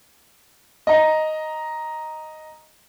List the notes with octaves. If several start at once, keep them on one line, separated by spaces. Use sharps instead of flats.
D#5 A#5